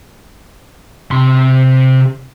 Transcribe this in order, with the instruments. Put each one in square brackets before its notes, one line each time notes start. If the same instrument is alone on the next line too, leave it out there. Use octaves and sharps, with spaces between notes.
[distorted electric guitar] C3 C6